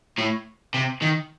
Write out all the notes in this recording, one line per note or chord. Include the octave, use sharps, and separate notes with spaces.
A2
C3
D#3